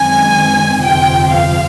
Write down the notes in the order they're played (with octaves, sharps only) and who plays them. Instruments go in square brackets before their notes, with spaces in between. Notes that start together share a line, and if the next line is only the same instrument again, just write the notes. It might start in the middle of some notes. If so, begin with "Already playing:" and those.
Already playing: [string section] F#2 D#3 G#3 C4 G#5
G1 F2 C3 F3 G5
F5